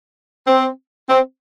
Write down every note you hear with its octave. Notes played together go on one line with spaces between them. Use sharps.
C4
C4